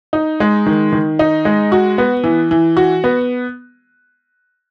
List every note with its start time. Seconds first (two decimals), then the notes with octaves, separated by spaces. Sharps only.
0.13 D#4
0.40 G#3
0.66 D#3
0.93 D#3
1.19 D#4
1.45 G#3
1.72 F#4
1.98 B3
2.24 E3
2.51 E3
2.77 F#4
3.04 B3